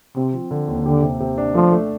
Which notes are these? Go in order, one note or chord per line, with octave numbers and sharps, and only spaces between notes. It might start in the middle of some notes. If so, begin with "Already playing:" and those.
C3 C4
F3
D3
D#2
D3 G4
C3
C3
D4
F3 A3
A3